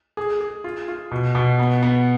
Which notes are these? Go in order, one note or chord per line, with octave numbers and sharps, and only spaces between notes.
G#4
G#4
F4
F4
B2
B2
B3
B3